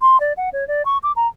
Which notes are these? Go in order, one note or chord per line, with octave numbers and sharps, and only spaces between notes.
C6
D5
F#5
C#5
D5
C#6
D6
A#5